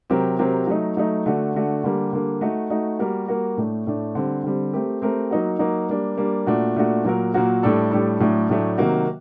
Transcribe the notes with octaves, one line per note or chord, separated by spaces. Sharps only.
C3 F#3 C4 G4 A#4
C3 F#3 C4 G4 A#4
F#3 A3 D#4
F#3 A3 D#4
D3 A3 D4 F#4
D3 A3 D4 F#4
D3 G3 A#3
D3 G3 A#3
A3 D#4 F#4
A3 D#4 F#4
G3 A#3 F#4 A#4
G3 A#3 F#4 A#4
A2 A3 D4
A2 A3 D4
D3 G3 C4
D3 G3 C4
A3 C4 G4 A#4
A3 C4 G4 A#4
F#3 A#3 D#4 F#4
F#3 A#3 D#4 F#4
G3 A#3 D4
G3 A#3 D4
A#2 A3 D4 F#4
A#2 A3 D4 F#4
A#2 F#3 A#3 F#4 A#4
A#2 F#3 A#3 F#4 A#4
A2 G3 D4 A4
A2 G3 D4 A4
A2 F#3 A3 D4
A2 F#3 A3 D4
C3 D#3 F#3 A#3 F#4